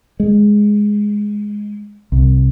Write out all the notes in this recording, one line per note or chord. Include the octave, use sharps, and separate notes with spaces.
G#3
C2